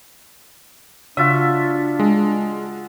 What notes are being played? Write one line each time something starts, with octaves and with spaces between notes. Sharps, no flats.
C#3 D4 F4 F#4 E5
G#3